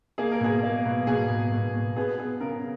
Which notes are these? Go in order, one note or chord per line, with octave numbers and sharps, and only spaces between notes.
A#3 G#4
A#4
B2 G#4
A#3
B2
B2 G#4
B2
B2
B2
B3 G#4
B3 G#4
C#3 A#4